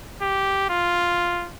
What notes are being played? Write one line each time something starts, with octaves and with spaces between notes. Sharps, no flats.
G4
F4